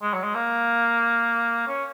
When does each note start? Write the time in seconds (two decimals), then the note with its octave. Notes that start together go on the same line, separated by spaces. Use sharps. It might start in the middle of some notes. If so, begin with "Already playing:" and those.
0.02 G#3
0.13 F#3
0.23 G#3
0.35 A#3
1.67 C#4